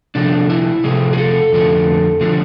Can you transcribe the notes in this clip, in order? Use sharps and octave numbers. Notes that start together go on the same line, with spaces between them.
C3 F3 A3 D4
E4
C3 F3 A3 G#4
G#4
A4
F2 D3 F3 A3
D3 F3 A3